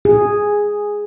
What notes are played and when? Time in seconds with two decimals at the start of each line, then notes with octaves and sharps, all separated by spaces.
0.05 G#4